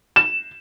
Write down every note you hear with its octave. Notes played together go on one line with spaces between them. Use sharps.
E7